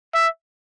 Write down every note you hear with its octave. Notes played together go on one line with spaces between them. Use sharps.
E5